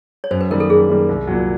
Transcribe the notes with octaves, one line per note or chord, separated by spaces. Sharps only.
C#5
F#2 C5
B4
D#3 G3 A#3 A#4
A4
F#2 G#4
D#3 G3 A#3
C2
A#2 F#3